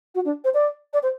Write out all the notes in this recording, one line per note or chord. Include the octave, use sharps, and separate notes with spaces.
F#4
D4
C5
D5
D5
C5